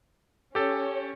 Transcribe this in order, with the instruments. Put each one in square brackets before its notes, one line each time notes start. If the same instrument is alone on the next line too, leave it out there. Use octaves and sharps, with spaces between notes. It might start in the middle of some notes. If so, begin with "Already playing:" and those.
[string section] C#4 C#5 [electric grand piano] G4 A4